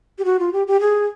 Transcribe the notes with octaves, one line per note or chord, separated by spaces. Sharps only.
G4
F#4
F4
G4
G4
G#4